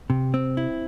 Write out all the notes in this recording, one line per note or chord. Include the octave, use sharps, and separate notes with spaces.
C3
C4
E4